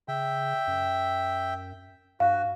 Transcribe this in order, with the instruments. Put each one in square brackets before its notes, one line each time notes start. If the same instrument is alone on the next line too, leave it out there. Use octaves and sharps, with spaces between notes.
[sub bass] C#3 [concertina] E5 G5
[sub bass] F#2
[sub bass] G2 [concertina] F#4 [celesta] F5